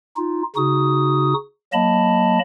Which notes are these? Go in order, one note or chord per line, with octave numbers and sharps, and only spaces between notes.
D#4 F4
C#3 D#4 F#4 D#6
F#3 A#3 D#5 A5 B5